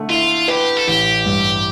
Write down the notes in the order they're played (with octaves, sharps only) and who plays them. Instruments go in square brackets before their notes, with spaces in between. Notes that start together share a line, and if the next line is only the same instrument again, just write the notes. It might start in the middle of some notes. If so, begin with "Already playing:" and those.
Already playing: [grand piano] D3 A3
[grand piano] E4 [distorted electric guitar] F4
[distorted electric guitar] G4 [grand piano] B4
[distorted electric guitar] A4
[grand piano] A1 [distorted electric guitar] G4
[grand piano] G2